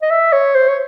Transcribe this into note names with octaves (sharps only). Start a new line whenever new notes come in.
D#5
E5
C#5
C5
C#5